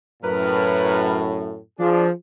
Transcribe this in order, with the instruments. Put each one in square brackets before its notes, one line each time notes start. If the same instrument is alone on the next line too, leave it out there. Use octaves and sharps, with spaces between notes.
[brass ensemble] F#2 A2 [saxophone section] A#4 B4
[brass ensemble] F3 G#4 [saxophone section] D4